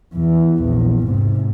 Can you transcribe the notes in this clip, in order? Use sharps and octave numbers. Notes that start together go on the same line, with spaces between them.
E2 E3
A#1 E2
G#2 C3